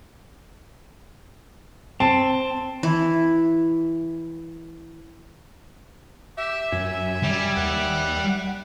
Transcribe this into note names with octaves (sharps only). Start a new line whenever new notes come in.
C4 A5
E3 E4
G4 E5
F#2 G#5
G3
D#2 F#5